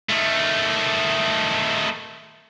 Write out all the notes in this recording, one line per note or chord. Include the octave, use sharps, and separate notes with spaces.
D#3 A3